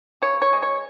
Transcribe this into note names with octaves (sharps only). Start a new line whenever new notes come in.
C#3 C#5
C#5
G#3
C#5